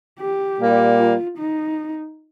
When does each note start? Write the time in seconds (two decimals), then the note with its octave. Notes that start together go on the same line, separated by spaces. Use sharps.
0.20 G4
0.60 A#2 G3 A#3
0.99 F4
1.38 D#4